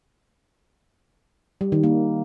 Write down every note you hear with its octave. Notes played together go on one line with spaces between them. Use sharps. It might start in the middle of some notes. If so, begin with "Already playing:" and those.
G3
D#3
A#3